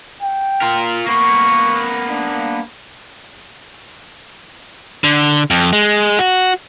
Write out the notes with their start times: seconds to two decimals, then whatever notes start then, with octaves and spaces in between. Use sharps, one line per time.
0.22 G5
0.62 F4 A#4
1.06 A#3 B3 C#6
2.10 D4
5.04 D3
5.51 F2
5.73 G#3
6.19 F#4